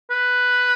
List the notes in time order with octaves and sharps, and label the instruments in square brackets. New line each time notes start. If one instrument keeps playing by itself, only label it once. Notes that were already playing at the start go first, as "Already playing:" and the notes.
[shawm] B4